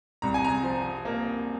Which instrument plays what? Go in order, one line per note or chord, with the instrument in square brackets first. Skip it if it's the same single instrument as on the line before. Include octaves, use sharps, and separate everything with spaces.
[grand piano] C2 A#5
G#5
A#5
F3
A#3